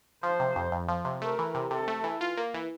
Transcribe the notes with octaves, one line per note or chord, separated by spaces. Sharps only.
F3 C5
C3
F2
F2
F3
C3
A3 A#4
E3
C3
C3 A4
A3
E3
F4
A#3
E3